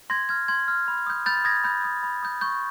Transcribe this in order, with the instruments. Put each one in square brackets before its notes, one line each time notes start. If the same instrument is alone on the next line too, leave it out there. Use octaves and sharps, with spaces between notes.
[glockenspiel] C6 G#6 A#6
F6 G#6
C6 G#6
F6
B5
D#6 G6
B5 G6 A6
D#6 G6 G#6 A#6
B5 G6
D#6 G6
B5
D#6 G6
C#6 G6